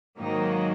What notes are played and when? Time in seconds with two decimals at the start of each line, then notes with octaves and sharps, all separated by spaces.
0.18 G#2 D#3 F#3 A#3 D#4